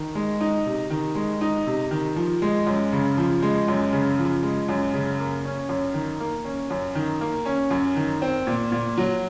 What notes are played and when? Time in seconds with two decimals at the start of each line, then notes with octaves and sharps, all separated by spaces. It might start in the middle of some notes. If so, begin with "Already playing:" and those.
Already playing: D#3
0.15 G#3
0.41 D#4
0.66 C3
0.90 D#3
1.15 G#3
1.41 D#4
1.66 C3
1.91 D#3
2.16 F3
2.42 G#3
2.66 F#2
2.93 C#3
3.17 F3
3.42 G#3
3.68 F#2
3.93 C#3
4.18 F3
4.43 G#3
4.68 F#2
4.94 C#3
5.19 A#3
5.45 C#4
5.69 F#2
5.94 D#3
6.20 A#3
6.44 C#4
6.70 F#2
6.95 D#3
7.21 A#3
7.46 C#4
7.70 F#2
7.96 D#3
8.22 C4
8.47 A#2
8.72 A#2
8.97 F#3